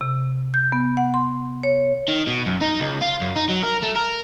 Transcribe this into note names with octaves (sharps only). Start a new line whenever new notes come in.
C3
G6
B3
F#5
C6
C#5
D#3
B2
F#2
D#4
C#2
F4
F#2
D#4
F#3
A#4
A3
A#4